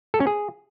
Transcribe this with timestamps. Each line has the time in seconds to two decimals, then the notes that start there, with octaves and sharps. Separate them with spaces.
0.14 A4
0.20 C#4
0.27 G#4